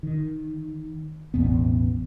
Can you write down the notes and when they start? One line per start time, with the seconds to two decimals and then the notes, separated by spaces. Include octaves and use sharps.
0.03 D#3
1.34 A1 E2 B2 B3